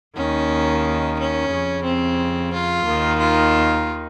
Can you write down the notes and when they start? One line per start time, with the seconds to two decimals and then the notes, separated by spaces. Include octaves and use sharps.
0.16 D#2 D#3 C#4
1.18 C#4
1.50 F2 C#3
1.84 C4
2.52 F4
2.85 D#2 D#3
3.19 F4